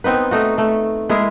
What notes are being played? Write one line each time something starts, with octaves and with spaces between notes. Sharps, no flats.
B3 C4 D#4 B4
A3 D#4 F#4
A3
G#3 E4 G#4 A#4